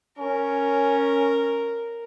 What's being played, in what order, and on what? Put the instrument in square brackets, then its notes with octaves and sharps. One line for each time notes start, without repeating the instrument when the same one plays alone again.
[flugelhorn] C#4 [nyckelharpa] A#4